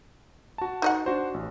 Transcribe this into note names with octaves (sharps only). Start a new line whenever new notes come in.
F#4 A5
D#4 D#5 F#5
D4 F#4 C5
A1